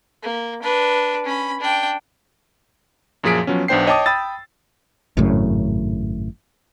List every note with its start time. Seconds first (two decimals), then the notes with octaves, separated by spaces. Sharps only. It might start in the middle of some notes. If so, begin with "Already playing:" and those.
0.23 A#3
0.63 D4 B4
1.26 C#4 B5
1.60 D4 G5
3.24 F#2 A#2 F3 G#4 B6 D7
3.47 F3 F#3 B3 C#4
3.68 B1 B3 D4 C5 G5 C7
3.87 C#5 D#5 G5 A5 D6 D#6
4.06 G5 B5 D#6 E6 A6
5.17 G#1 F#2 A2 C#3